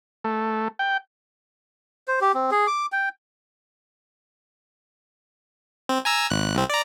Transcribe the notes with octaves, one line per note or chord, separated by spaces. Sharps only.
A3
G5
C5
G4
C4
G#4
D6
G5
C4
G#5 A#5 E6
G#1 F#6
C2 C4
D5 A#5